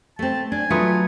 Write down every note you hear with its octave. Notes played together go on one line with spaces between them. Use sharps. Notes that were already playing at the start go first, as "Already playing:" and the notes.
A3 C4 A5
D4 G#5
F#3 A3 F4 B4 D#6 C#7